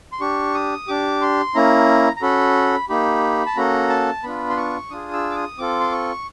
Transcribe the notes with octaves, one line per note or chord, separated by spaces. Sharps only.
C6
D4 G4 C#6
D#6
D4 G4 D6
C6
A#3 C#4 E4 A#5
A#5
C#4 F#4 A4 B5
A#3 D#4 G4 B5
A5
A#3 C#4 F#4 A4 A#5
A5
B3 D4 F4 B5
C6
C#6
D4 F4 G#4 D#6
E6
D6
D#6
C4 F4 A4 D6
C6
C#6